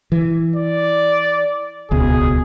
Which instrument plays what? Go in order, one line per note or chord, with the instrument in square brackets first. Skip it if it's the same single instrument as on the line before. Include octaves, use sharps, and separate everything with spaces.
[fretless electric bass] E3
[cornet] D5
[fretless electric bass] D#1 C#2 B2 [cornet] G#4